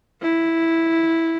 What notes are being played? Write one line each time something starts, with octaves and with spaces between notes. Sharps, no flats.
E4